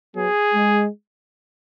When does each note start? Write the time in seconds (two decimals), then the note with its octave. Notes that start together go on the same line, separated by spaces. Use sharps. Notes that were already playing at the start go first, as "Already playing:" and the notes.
0.16 F#3 B3 G#4
0.54 G#3